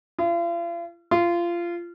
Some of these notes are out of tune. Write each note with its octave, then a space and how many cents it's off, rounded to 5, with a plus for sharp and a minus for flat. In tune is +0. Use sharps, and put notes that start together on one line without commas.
F4 -40
F4 -20